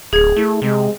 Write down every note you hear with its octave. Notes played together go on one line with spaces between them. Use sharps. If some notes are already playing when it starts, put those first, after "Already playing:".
D1 G#4 G#6
A3 E4
C3 G#3